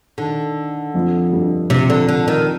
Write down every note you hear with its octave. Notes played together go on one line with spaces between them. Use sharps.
D3 D#3
F2 F3
G2 G3
F2 C3 F3
D3
D3
D#3